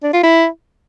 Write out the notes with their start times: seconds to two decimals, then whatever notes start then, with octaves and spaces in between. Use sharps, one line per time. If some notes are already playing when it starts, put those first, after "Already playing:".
0.03 D4
0.13 F4
0.24 E4